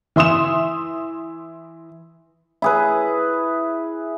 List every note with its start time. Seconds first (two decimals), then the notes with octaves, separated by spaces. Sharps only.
0.16 E3 E5 C6 D#6 E7
2.62 E4 G#4 B4